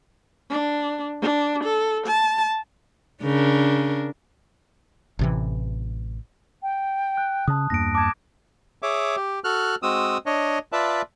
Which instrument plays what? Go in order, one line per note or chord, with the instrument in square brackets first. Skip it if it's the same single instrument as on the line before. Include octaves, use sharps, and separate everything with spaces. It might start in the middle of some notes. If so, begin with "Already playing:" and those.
[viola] D4
D4
A4
A5
[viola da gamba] C#3 D4 A#4
[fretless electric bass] A1 C3 E3
[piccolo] G5
[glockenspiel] F#6
[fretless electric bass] C#3 [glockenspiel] A5 D#6
[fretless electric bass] E2 G2 A#3 [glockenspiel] A#6 D7
[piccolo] A5 [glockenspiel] D6 G#6
[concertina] G#4 C#5 E5 D6
G4
F#4 A4 F6 F#6
G#3 C4 F#4 D#6 E6
D4 C#5 D#5
F4 B4 D5 E5 A5